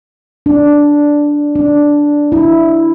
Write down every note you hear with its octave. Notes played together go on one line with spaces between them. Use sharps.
D4
D4
E4